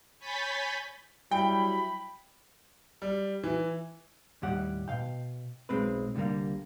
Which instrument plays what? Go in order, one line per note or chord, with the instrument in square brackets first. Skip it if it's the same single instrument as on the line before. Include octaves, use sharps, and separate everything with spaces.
[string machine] C#5 G#5 B5 G6 A6 B6
[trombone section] F#3 G3 E4 [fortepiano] G5 [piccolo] B5
[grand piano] G3
E3
[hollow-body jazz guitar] D#2 A2 G3 G4 F#5
B2 F5 G5
B1 G#3 C4 B4
C2 D3 D#3 G3 A#3